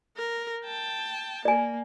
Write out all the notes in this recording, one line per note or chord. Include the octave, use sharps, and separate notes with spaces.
A#4
G5 A5
A#3 D5 G#5